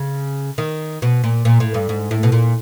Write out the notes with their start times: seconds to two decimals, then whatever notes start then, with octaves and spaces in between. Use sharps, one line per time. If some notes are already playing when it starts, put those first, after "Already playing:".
Already playing: C#3
0.58 D#3
1.02 B2
1.24 A#2
1.45 A#2
1.60 A2
1.74 G2
1.89 G#2
2.11 A2
2.23 B2
2.32 A#2